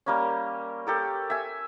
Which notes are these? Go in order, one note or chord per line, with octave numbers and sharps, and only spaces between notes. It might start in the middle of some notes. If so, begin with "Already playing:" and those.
G3 A#3 C#4
G4 A4 A#4
E5 G#5